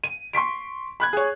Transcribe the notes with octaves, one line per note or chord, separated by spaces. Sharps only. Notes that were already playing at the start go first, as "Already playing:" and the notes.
D#7
C6 C#6 B6 D7
B5 F#6 G#6
G#4 C#5